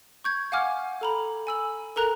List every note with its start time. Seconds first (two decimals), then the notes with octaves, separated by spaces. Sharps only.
0.24 C#6 G6 G#6
0.52 F5 F#5 G#5 D6 F6 G#6
1.01 A4 A#5 B5
1.47 G#5 E6 F#7
1.96 A4 A#4 A#5 F#6 F7